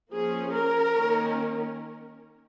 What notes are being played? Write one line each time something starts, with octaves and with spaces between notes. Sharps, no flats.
F3 A#3 C#4 G#4
A#4
D#3 A#3 C#4